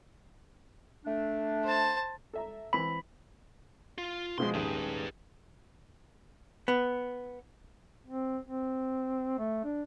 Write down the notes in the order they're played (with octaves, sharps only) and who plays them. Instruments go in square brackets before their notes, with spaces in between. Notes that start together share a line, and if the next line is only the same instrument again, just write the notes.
[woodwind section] A3 D4
[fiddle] C5 A5
[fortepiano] A4 E5 A#5
[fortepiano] E3 C4 [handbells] B5
[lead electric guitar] F4
[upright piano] B2 F3 G#3 [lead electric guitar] C6
[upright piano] D#1 G#2 G#4 [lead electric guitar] G4 B4
[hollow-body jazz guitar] B3
[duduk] C4
C4
A3
D4